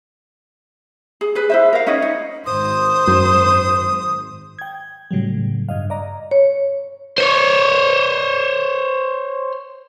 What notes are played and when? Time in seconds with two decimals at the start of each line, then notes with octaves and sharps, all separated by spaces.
1.21 G#4
1.35 G#4 B4
1.50 E4 C5 E5
1.73 A#4 F5
1.87 C#4 D#4 E4 D#5
2.02 D#4
2.46 G#1 C5 D#6
3.07 F#2
4.59 G5 G#6
5.11 A2 C#3 F#3 G3
5.69 G2 D#5 F5
5.90 D5 D#5 A#5
6.31 C#5
7.18 C5 C#5